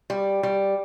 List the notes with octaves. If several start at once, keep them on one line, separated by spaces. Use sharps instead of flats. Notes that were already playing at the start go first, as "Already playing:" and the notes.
G3
G3